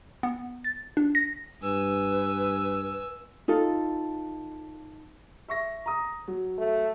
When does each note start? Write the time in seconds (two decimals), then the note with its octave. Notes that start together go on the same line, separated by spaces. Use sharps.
0.23 B3
0.64 A6
0.97 D4
1.15 A#6
1.63 G2 B4 G#5 E6
3.48 D#4 F4 A4
5.48 E5 C#6 A#6
5.86 A#5 D#6
6.28 F#3
6.58 A3